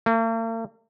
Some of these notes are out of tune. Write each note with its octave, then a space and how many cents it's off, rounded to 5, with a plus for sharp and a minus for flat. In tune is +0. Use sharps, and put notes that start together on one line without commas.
A#3 -45